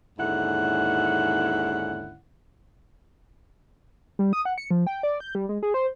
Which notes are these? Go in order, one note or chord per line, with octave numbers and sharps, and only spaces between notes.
D#2 G#2 D3 C#4 E4 F#5
G3
D#6
F#5
C#7
F3
G5
D5
G6
G3
G#3
G#4
C5